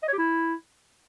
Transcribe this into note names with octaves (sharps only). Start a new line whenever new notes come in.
D#5
C#5
G4
E4